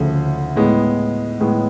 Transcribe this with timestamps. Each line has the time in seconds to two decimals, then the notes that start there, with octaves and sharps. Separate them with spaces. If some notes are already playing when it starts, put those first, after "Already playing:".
Already playing: D2 C#3 F3 A3
0.56 A2 G#3 B3
1.40 A2 G#3 B3